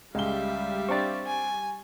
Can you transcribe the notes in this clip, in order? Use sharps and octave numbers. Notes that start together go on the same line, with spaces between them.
C#2 G3 G#3 E5 F5 G7
C4 D4 C#6 A6
G#5